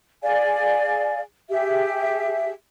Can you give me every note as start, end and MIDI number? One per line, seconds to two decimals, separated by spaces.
0.23 1.20 68
0.23 1.20 74
0.23 1.20 77
0.23 1.20 80
1.50 2.51 67
1.50 2.51 68
1.50 2.51 76